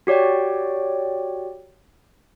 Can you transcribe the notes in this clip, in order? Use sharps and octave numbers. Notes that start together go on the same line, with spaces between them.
F#4 G4 C#5 D5 G5